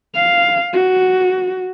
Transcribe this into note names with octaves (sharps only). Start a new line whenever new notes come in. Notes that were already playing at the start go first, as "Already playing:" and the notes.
F5
F#4